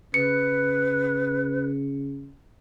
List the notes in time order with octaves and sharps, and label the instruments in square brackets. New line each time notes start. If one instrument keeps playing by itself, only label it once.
[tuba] C#3 [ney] B4 [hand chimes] C#7